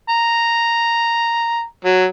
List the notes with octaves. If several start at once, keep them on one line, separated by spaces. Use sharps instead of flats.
A#5
F#3